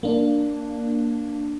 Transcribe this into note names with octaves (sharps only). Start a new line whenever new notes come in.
A#3 D4